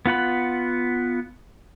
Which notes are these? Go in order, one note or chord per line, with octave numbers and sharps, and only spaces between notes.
B3 F4 F#5 B5